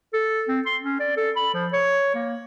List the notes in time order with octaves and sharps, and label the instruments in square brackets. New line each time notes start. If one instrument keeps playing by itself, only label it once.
[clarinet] A4
C4
C6
C#4
D5
A4
B5
F3
C#5
A#3